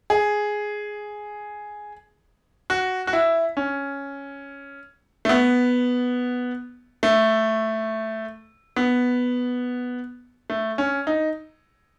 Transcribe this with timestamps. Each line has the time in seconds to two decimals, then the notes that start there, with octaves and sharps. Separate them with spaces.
0.10 G#4
2.70 F#4
3.07 F#4
3.13 E4
3.57 C#4
5.25 A3
5.29 B3
7.03 A3
8.76 B3
10.50 A3
10.78 C#4
11.07 D#4